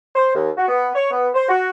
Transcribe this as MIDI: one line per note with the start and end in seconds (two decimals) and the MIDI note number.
0.14 0.30 72
0.34 0.49 39
0.57 0.65 66
0.68 0.88 59
0.95 1.07 73
1.11 1.28 59
1.34 1.47 72
1.49 1.70 66